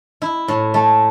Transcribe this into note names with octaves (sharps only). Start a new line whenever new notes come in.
E4
A2
A3